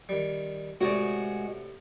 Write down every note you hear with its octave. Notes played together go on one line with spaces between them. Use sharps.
D#3 G3
A2 C3 G#3 F#4 D5